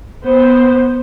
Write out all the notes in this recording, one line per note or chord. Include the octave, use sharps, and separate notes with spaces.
B3 C5